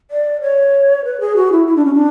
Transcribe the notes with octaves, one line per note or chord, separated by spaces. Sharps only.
D5
C#5
B4
G#4
F#4
E4
E4
D4
C#4
D4